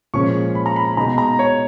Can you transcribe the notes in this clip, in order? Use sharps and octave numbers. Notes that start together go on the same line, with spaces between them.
A#2 F3 G#3 C#4 C#6
B5
A#5
B5
B2 G#3 D#4 A#5
A#5
C#5